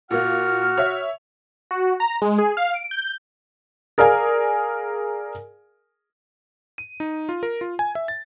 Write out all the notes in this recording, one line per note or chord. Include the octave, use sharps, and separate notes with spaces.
A#2 A#3 F#4 F#5 F6
C#5 E5
F#4
A#5
G#3
G#4
F5
D7
G6
G#4 A#4 D5 F5 G#5
D#7
D#4
F4
A#4
F4
G#5
E5
A6